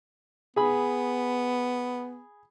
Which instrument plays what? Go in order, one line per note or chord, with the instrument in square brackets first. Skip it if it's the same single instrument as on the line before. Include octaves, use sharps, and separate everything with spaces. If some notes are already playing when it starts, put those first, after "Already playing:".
[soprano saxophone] B3 [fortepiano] G#4 B5